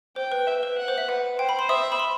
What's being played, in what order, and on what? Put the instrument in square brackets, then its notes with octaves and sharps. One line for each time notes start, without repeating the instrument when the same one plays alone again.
[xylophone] C5 [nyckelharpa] G5
[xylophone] B4
[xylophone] B4 [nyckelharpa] E5
[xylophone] B4
[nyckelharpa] F#5
[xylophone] C5
E5
[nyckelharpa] B4 [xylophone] F#5
[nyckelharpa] C5 [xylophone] G5
[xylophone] B5
C6
[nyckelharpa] E5 [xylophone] D#6
[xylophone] B5
C6